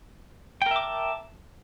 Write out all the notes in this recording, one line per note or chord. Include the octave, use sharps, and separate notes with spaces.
A#4 E5 G5 A5 D6